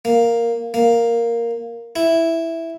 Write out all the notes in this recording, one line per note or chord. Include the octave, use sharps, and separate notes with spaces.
A#3
A#3
E4